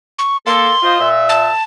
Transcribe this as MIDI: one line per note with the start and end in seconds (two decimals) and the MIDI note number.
0.19 0.37 85
0.46 0.70 58
0.46 0.70 69
0.46 1.08 84
0.82 0.98 65
0.82 0.98 72
0.82 0.98 75
1.00 1.48 46
1.00 1.48 76
1.29 1.63 81